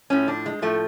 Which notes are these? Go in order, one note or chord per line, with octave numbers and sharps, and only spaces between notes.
A2 F3 C#4
D4
G#3
A2 F3 A3